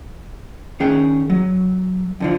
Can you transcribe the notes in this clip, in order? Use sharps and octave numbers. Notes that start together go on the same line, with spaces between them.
D#3 C#4 G#4 G5
F#3
F2 D3 F3